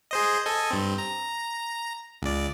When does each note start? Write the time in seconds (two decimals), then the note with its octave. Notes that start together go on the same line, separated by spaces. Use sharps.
0.11 G#4 C5 D#5
0.46 A4 D#5 G#5
0.71 G2 C4
0.98 A#5
2.22 C#2 D5